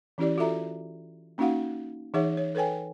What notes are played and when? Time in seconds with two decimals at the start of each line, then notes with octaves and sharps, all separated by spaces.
0.18 E3 C#4 E4 G4 D5
0.38 F4 F#4 A4 E5 A#5
1.38 A#3 C#4 D#4 F#4 F5 F#5
2.14 E3 D#4 G#4 C#5 E5 F#5
2.37 C#5
2.55 A4 B4 C#5 G5 G#5